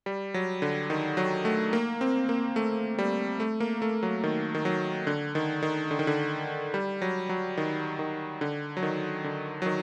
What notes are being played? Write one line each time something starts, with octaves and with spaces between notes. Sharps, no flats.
G3
F#3
D3
D#3
F#3
A3
A#3
C4
A#3
A3
G3
A3
A#3
A3
F#3
D#3
D#3
F#3
D3
D#3
D#3
D3
D#3
D3
G3
F#3
F#3
D#3
D#3
D3
F#3
D#3
D3
F#3
D#3